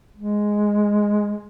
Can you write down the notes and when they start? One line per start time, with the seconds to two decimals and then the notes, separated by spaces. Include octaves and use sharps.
0.16 G#3